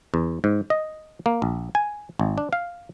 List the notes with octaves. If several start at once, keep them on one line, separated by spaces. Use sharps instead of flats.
E2
G#2
D#5
A#3
A#1
G#5
G#1
D4
F5